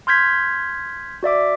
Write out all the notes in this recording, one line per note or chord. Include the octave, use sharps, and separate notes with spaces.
C6 F6 G6 G#6 B6
F#4 D5 E5 D6